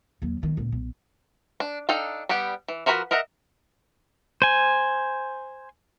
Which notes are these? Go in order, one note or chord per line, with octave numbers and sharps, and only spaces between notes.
D#2 F#3
B1 D#3
C#2 A#2
B1
D4
D4 D#4 A4 F5 G5
G3 B3 G4 F#5
E3
F3 F#4 A#4 B4 B5
A#4 D#5 E5 F#5 A#5
C5 G#5